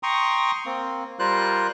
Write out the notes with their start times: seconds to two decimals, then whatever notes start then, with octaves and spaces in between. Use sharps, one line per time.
0.03 G5 A#5 C6 C#6 D#6
0.66 A#3 C4
1.19 G3 F4 A#4 C5 F#6